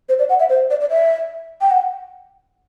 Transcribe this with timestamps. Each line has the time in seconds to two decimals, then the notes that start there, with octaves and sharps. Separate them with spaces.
0.09 C5
0.19 D5
0.29 F#5
0.40 E5
0.49 C5
0.70 D5
0.81 D5
0.90 E5
1.61 G5
1.71 F#5